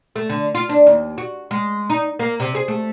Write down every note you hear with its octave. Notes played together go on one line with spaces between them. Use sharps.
A3
D3
F4
D4
D#2
F#4
G#3
D#4
A#3
C3
G#4
A3